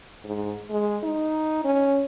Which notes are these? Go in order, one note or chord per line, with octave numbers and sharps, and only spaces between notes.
G#2
G#3
D#4
C#4